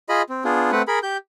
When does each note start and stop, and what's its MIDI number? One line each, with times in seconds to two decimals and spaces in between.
0.09 0.22 65
0.09 0.22 68
0.09 0.22 75
0.09 0.22 83
0.29 0.44 60
0.44 0.71 59
0.44 0.71 62
0.44 0.71 65
0.44 0.71 68
0.72 0.82 57
0.72 0.82 60
0.72 0.82 71
0.72 0.82 78
0.88 0.99 68
0.88 0.99 70
0.88 0.99 83
1.03 1.17 67
1.03 1.17 91